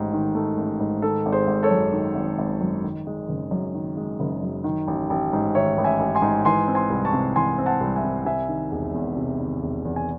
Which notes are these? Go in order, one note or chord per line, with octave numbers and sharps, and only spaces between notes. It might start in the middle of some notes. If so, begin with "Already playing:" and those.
Already playing: A1 G#2 D#3 A3
D#3
A3
A1
G#2
D#3 A4
G#1
G#4 C5
G#1
A4 C#5
F#2
D#3
G#1
G#1
F#2
D#3
G#3
F#1
F#2
D#3
G#3
F#1
F#2
D#3
A1
A1
G#2
D#3 C#5 E5
A1
E5 G#5
A1
G#5 C6
G#2
E3 G#5 C6
C4
G#5 C6
C2
A5 C#6
C3
E3 G#5 C6
C4
F#5 A5
C2
E5 G#5
C3
C3 E5 G#5
D#3
E1
E2
C3
D#3
E1
E2
G#5